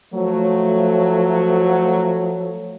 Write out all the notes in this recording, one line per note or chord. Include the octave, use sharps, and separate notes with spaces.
F3 F#3 A3